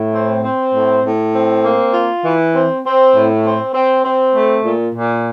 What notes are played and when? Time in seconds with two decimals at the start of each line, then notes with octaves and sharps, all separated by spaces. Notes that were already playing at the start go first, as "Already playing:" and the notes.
Already playing: A2
0.13 C4
0.43 C4
0.74 A2
1.04 A2
1.34 C4
1.64 A#3
1.93 F4
2.24 E3
2.54 C4
2.85 C4
3.15 A2
3.45 C4
3.74 C4
4.05 C4
4.34 A3
4.65 A#2
4.94 A#2